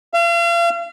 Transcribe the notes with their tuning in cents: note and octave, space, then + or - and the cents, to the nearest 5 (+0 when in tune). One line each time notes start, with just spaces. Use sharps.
F5 -40